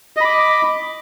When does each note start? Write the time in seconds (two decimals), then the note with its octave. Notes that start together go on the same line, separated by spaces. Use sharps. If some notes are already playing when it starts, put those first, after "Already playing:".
0.17 D#5
0.21 B5
0.25 D6